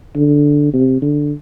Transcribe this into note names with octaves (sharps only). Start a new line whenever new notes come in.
D3
C3
D3